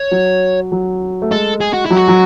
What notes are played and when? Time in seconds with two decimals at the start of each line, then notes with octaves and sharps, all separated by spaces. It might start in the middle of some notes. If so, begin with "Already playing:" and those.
Already playing: C#5
0.11 F#3
0.72 F#3
1.22 A3
1.31 G#3 A4
1.61 G#4
1.73 F#4
1.85 F#3 E4
1.97 F#4
2.08 F#3